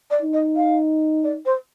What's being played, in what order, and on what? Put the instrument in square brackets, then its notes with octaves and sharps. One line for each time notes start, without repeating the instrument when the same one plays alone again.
[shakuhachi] D5
[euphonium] D#4
[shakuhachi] D#5
F5
D5
C5